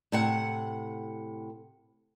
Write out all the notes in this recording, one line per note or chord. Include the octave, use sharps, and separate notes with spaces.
A2 C3 F#5